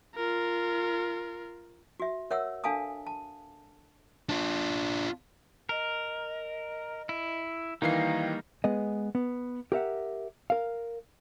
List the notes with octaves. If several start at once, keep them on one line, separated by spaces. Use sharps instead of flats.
F4 A#4
F#4 E5
A#4 C#5 E5 F#5 E6
D4 A4 F5 G#5 A5 D#6
A5
D4 F4
A#4 D#5
E4
D#3 E3 G3 A#3 D#4 F5 C7
G#3 B3 G#4 D#5
B3
G4 A#4 E5 F#5
A#4 F5